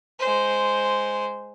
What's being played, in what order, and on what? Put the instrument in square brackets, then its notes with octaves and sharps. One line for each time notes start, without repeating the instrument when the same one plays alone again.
[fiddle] G#3 C5